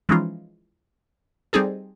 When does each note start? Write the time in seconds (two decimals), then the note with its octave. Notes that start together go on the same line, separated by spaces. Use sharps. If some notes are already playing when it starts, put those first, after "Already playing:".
0.09 E3 F3 G#3 C#4 D#4 F4
1.53 G3 C4 D#4 G#4 A4